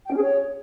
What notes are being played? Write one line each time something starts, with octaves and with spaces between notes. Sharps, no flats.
G5
C#4
G#4
C#5